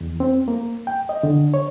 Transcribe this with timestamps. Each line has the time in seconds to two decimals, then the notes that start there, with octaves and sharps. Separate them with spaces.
0.01 E2
0.20 C4
0.48 A#3
0.87 G5
1.09 D#5
1.23 D3
1.54 C#5